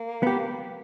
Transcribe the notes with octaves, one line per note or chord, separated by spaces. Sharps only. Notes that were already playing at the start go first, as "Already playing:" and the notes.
Already playing: A#3
B3 G4